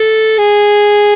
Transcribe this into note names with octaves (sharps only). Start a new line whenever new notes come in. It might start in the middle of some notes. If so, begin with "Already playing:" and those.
Already playing: A4
G#4